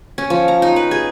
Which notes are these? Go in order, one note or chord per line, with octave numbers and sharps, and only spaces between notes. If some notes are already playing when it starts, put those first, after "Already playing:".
C#4
F3
A#5
D#4
B4
G#4